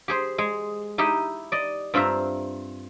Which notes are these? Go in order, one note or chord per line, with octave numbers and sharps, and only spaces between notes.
G4 G#4 C5
G#3 G#4
D#4 E4 G4 D#5 E5
D5 D#5
G2 C4 F4 C5 E5 A#5